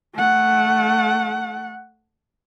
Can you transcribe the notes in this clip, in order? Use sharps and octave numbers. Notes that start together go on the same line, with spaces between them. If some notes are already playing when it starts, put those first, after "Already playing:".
A3 F#5